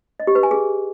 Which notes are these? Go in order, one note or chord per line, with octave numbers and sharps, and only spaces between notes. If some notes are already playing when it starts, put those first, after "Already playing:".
D#5
G4
B4
G#5
G#4